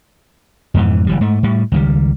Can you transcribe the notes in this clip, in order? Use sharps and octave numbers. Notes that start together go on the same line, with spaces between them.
F2 G#2 B2 E3
F#1 E3 G3
G#2 A3
A2 G3
C#2 D#3 G3